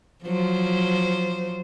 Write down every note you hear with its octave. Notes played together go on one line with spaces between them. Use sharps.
F3 F#3 C5